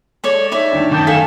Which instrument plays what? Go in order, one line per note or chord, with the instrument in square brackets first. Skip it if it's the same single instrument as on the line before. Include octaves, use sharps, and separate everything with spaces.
[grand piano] G#3 [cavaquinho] A4 C#5 D5
[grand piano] D#4 [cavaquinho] C#5 D5 [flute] E5
[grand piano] D2 G2 D#3
[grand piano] F#2 D6 G6 [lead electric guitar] D#3 [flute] A5
[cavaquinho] A4 F5 G#5 [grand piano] B6 E7